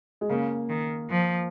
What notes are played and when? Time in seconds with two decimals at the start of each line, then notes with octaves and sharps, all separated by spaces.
0.21 G#3
0.29 C#3 A#3
0.69 D#3
1.10 F3